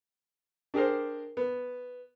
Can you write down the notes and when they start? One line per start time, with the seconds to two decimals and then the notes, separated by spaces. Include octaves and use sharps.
0.74 D4 G4 G#4 A#4 C5
1.37 B3